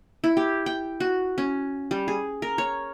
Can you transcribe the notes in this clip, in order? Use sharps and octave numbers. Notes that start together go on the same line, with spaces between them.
E4
G4
G5
F#4
C#4
G3
G#4
A#4
C#5